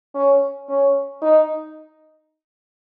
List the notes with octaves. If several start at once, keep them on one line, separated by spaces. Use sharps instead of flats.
C#4
C#4
D#4